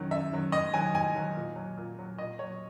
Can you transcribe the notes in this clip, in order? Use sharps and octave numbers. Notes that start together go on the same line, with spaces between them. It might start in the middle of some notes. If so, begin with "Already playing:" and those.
Already playing: F#2 D#3 F#3
F#2 E5
D#3 F#3
G#2 D#5
D#3 F#3 G#5
G#2 G#5
D#3 F#3
A#2
F#3
A#2
F#3
A#2 D#5
F#3 C#5